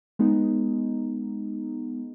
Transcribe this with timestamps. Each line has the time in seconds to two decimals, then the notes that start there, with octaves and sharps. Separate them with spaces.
0.19 G#3 B3 D#4